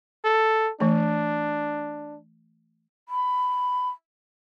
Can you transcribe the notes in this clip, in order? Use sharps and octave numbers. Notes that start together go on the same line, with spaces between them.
A4
E3 A3 D4
B5